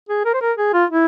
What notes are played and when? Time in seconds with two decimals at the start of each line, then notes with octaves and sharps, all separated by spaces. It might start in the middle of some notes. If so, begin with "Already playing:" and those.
0.09 G#4
0.25 A#4
0.34 C5
0.41 A#4
0.58 G#4
0.74 F4
0.90 E4